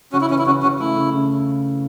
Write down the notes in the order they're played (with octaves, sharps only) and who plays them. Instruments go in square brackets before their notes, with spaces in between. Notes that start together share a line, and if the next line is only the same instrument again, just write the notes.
[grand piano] C#3 [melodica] C#4 F#4
[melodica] E4
[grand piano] E3 [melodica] C#4
[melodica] E4
[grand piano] C#3 [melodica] C#4 F#4
[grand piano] C#3 [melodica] C#4 F#4
[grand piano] A3 [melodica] E4
[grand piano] C#3
C#3